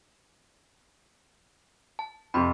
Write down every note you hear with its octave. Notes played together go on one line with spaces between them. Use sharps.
A5
F2 C3 B5 C6